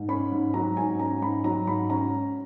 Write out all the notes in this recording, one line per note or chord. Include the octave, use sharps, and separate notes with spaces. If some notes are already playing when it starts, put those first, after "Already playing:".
Already playing: G#2
C#4 B5
G#2
F#3 A#5
G#2 G#5
C#4 A#5
G#2 B5
F#3 A#5
G#2 B5
C#4 A#5